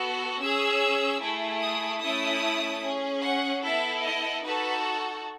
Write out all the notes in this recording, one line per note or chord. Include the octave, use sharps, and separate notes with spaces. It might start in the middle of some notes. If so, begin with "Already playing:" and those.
Already playing: B3 F#4 A4
C#4 G#4 E6
A3 E4 G#4
D#6
A3 C#4 E4 A4 D#6
C#4 G#4
F#5
B3 E4 A4 E5
D#5
D#4 F#4 A4 B4